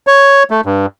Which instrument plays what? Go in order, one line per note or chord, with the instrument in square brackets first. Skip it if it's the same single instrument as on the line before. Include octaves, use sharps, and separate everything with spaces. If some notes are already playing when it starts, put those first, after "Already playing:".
[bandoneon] C#5
A3
G2